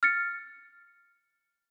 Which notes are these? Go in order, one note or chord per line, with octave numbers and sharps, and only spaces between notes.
F6 A6 C#7